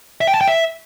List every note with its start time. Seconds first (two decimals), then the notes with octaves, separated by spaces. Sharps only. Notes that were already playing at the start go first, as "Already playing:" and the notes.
0.21 E5
0.27 G5
0.34 A5
0.41 G5
0.48 E5